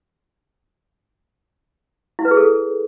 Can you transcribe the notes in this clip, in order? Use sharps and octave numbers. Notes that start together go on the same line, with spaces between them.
E4
B4
G#4
A4